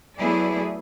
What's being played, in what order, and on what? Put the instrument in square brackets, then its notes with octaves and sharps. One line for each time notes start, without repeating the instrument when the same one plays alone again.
[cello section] F#3 A3 B3 E4 G#4 D5